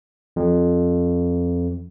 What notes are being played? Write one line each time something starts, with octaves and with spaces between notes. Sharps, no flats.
F2